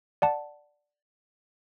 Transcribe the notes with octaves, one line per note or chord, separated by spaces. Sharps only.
D5 F#5 A5